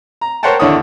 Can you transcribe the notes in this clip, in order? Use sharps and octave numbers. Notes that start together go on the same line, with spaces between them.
A#5
A#4 C5 C#5 F#5 G5 A5
D#2 D3 D4 E4 C#5 D#6